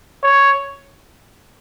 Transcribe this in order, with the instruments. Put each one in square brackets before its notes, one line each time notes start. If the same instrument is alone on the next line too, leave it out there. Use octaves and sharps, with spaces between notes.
[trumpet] C#5